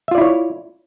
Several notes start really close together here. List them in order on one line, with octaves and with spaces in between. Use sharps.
E5 F4 D5 E4 C#5